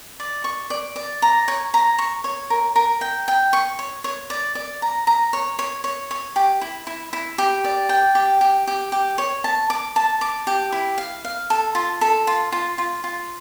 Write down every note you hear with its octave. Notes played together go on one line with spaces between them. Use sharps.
D5
C#6
D5
D5
A#5
C#5
A#5
C#6
C#5
A#4
A#4
G5
G5
C#6
C#5
C#5
D5
D5
A#5
A#5
C#5
C#5
C#5
C#5
G4
E4
E4
E4
G4
D5
G5
G4
G4
G4
G4
C#5
A5
D6
A5
D6
G4
E4
F5
F5
A4
F4
A4
F4
F4
F4
F4